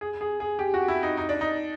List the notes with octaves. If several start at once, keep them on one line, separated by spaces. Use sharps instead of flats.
G#4
G#4
G#4
G4
F#4
E4
D#4
D#4
D4
D#4